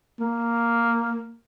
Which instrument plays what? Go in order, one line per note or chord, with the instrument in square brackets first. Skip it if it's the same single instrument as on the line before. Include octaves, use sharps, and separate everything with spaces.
[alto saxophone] A#3